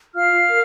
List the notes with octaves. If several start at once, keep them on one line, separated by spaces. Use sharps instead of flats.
F4 F5 F6
A#4